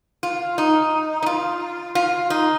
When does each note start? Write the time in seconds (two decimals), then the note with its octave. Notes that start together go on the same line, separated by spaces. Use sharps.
0.23 F4
0.58 D#4
1.22 D#4
1.26 F4
1.95 F4
2.30 D#4